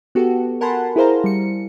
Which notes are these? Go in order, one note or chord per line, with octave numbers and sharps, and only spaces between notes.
B3 F#4 G4 A4
A#4 F#5 G#5 A5 B5 C6
E4 G#4 A#4 C5 F5 A#5
G3 C#7